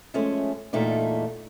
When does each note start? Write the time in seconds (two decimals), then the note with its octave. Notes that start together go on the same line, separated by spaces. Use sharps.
0.14 F3 G#3 A3 C#4
0.73 E2 A#2 A3 D#4 D5